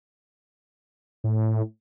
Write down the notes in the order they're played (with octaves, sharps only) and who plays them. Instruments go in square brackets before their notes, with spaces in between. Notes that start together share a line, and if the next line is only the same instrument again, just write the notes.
[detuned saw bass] A2